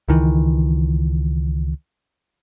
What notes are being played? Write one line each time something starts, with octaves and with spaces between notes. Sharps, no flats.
C#2 D#3 E3